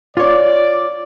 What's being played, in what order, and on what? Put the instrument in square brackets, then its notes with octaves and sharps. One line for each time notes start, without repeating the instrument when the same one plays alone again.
[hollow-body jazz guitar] F4 C#5 [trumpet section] D5